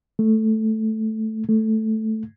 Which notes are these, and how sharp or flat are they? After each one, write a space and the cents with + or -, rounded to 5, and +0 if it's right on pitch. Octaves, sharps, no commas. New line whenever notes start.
A3 -5
A3 -5